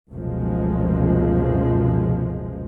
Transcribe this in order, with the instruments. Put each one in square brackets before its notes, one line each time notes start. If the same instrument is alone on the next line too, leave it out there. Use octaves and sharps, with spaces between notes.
[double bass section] F1 C#2 F#2 B2 F3 G#3